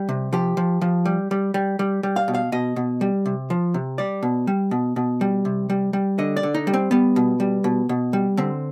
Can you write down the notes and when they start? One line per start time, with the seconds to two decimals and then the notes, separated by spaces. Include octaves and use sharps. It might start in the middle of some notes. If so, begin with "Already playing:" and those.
Already playing: G3
0.09 C3
0.33 F3 G4
0.57 F3
0.81 F3
1.06 G3
1.31 G3
1.54 G3
1.79 G3
2.03 G3
2.16 F5
2.28 B2
2.34 F5
2.52 B2 D#5
2.76 B2
3.01 G3
3.26 C3
3.50 F3
3.74 C3
3.98 G3 D5
4.23 B2
4.47 G3
4.71 B2
4.96 B2
5.21 G3
5.45 C3
5.70 G3
5.93 G3
6.19 D3 D#5
6.36 D5
6.43 D3
6.54 D#4
6.67 G3
6.74 C4
6.91 G3 B3
7.16 B2
7.40 G3
7.64 B2
7.89 B2
8.13 G3
8.37 D3 C4